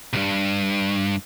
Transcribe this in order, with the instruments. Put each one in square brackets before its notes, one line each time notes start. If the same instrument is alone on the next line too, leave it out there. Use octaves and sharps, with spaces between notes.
[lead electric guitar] C2 G2